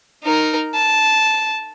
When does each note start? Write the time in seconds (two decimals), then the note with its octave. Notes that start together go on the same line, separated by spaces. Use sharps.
0.24 D#4 A#4
0.75 A5